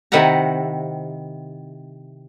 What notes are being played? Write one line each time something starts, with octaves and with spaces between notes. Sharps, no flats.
C3 D#3 E4 F#5 A#5